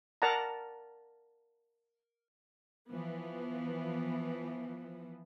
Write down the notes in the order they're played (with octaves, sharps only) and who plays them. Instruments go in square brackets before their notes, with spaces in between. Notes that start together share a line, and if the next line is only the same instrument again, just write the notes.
[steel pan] A#4 D5 F#5 A5 A#5
[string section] E3 F3 B3